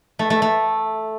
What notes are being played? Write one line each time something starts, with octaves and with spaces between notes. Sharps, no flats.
A3
A3
A3